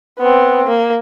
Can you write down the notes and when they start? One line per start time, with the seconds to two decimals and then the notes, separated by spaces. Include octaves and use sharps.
0.19 B3 C4
0.67 A#3